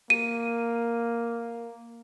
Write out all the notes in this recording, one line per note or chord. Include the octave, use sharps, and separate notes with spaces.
A#3 D#7